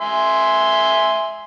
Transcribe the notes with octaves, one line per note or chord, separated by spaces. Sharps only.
E5 G#5 C6